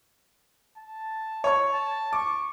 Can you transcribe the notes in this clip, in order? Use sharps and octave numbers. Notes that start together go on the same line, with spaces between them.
A5
C#5 C#6
A5
C#6 D6